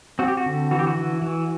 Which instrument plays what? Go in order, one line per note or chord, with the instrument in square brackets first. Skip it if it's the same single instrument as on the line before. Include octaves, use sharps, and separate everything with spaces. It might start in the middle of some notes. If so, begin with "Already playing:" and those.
[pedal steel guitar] C4 F#4
G4
F#4
D3
E3 F#4
G4
F#4
E3
E3